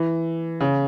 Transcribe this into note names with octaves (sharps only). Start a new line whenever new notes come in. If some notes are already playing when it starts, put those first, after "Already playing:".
Already playing: E3
C#3